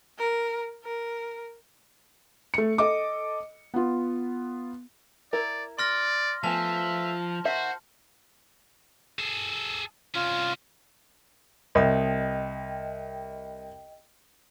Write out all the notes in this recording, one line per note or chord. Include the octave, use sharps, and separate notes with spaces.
A#4
A#4
A3 C#7
A4 D#5 D6
B3 F4
E4 A#4 D5
D5 C6 F6 A#6
F3 A3 B3 E5 G#5 A5
D#3 F#4 C5 E5
G#4 A4
C2 C#4 F4
C2 D#5 G5